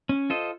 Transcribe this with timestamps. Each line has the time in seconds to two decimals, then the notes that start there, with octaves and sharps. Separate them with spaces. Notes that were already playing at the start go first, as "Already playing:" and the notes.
0.09 C#4
0.30 F4 A4 C5 D#5